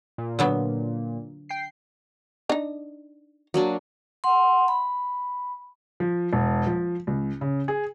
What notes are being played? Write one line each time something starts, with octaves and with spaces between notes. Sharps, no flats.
A#2
D3 F#3 B3
G5 C7
D4 D#4
F#3 A#3 D4
F#5 C6
B5
F3
E1
F3
C#2
C#3
G#4